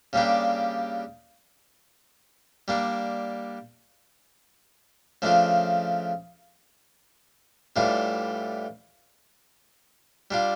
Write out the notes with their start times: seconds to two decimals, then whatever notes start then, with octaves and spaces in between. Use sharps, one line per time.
0.13 C#3 G3 A#3 D4 G4
2.68 G3 A#3 D4
5.22 C#3 F3 A3 D4 F4
7.76 A2 E3 G3 D4 F4
10.31 G3 D4 F4